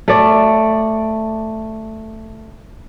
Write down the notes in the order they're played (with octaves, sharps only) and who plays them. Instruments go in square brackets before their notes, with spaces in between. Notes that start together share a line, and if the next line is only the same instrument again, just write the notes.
[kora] A3 D5